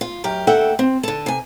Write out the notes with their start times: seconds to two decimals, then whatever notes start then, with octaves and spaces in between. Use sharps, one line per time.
0.01 F4
0.24 F#2 G4 A#4
0.47 D2 A#3 A4 E5 F#5 G5
0.79 C4
1.03 D3 A4
1.26 C3 G#5